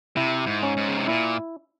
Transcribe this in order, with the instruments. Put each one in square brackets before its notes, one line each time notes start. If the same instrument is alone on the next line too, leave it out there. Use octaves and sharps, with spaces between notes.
[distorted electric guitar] C3 [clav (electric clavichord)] E4
[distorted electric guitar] G#2
[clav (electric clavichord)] C#4
[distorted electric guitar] G#2
C#3
C3
[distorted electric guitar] A#2 [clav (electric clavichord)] E4